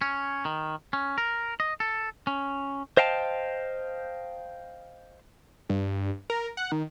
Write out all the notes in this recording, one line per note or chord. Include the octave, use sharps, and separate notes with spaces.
C#4
D#3
C#4
A#4
D#5
A4
C#4
C5 D#5 F5 G5 A5
G2
A#4
F#5
D#3